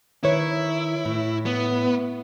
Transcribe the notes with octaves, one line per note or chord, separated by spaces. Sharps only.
D#3 E4 B4 C#5
A2
B3